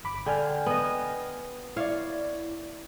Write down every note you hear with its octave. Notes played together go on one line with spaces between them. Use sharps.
G1 B5 D6
D3 G5 G#5 F6
B3 D#5
E4 C#5 D5 F5